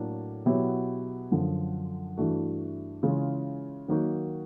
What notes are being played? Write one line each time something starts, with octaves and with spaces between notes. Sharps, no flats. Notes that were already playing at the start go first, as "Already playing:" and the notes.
Already playing: A2 F#3 A#3 D4
B2 F#3 B3 E4 G4
F#2 D3 F3
G2 E3 A3 D4 F#4
C#3 E3 G#3 C#4 F4
D#3 F#3 A#3 D#4 F#4